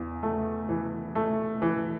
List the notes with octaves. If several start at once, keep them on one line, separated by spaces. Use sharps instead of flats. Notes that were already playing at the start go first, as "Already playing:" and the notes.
Already playing: E2
A3
E3
A3
E3